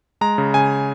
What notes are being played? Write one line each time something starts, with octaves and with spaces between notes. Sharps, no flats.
G#3 A#5
C#3
C#3 G#5